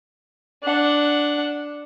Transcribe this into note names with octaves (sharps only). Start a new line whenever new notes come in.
D4 F#5